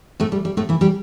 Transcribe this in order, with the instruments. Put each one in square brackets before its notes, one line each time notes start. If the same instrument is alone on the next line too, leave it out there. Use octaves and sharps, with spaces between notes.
[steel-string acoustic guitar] A2 A3
G3
G3
A2 A3
E3 E4
G3 G4